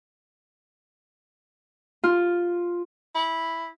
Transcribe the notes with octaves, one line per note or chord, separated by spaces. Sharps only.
F4
E4